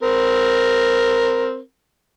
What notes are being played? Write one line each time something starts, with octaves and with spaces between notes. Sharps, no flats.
C4 A#4